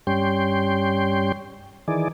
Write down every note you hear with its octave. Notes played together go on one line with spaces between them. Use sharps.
G2 G3 C#4 G5 C6
D#3 E3 G#4 D5